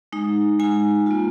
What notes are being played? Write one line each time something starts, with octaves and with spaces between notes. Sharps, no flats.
G#3 D#4
G#3 D#4 G#5
A#3 F4